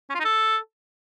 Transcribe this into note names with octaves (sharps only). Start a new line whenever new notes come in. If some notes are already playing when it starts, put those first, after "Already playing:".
C#4
F4
D#4
A4